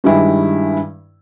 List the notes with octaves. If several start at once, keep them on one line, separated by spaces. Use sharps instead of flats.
G2 D#3 G3 G#3 E4